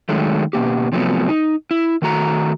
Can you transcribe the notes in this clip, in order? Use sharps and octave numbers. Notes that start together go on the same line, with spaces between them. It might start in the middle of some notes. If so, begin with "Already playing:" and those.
D#3 F#3 G#3 A3
B2 E3 A#3 G4
C3 F3 F#3 G#3 A3 B3
D#4
E4
D#3 A3 F#4 A#5